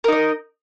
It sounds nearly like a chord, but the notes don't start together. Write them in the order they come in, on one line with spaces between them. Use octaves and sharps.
A#4 D#4 D#5